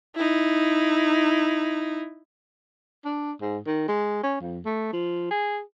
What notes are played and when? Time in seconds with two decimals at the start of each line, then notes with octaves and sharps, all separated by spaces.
0.16 D#4 E4
3.05 D4
3.41 G#2
3.66 D#3
3.88 G#3
4.23 C#4
4.41 F2
4.65 A3
4.93 F3
5.31 G#4